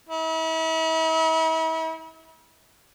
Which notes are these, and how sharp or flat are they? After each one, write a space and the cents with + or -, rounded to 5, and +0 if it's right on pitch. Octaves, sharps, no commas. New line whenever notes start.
E4 -40